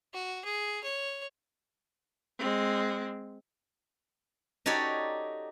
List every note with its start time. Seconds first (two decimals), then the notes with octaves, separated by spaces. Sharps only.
0.13 F#4
0.44 G#4
0.83 C#5
2.39 G#3 C4
4.66 D#4 F#4 G4 A4 C#5 D5